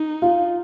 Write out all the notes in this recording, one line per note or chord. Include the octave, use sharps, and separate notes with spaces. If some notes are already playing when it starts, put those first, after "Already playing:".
Already playing: D#4
F4